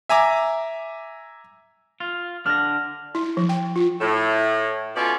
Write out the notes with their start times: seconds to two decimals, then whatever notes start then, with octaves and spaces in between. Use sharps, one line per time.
0.09 E5 G#5 A#5 D6
2.00 F4
2.46 D3 D4 F6 A#6
3.15 E4
3.37 F3
3.49 G5
3.76 F4
4.01 A2
4.96 B2 C#4 F4 A4 C#5 D5